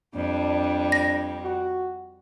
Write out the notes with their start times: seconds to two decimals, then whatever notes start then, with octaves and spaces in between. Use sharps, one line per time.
0.15 F2 G3 D4
0.92 A#6
1.43 F#4